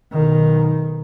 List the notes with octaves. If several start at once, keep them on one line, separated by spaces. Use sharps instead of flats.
B1 D#3